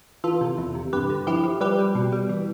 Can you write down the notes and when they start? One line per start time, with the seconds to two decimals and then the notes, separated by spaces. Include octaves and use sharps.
0.24 E3 F4 A4
0.41 C3
0.58 E2
0.75 C3
0.93 G2 G4 B4
1.10 D3
1.27 F3 E4 G4
1.44 F3
1.61 G3 G4 B4
1.79 G3
1.95 B2
2.13 G3
2.29 E3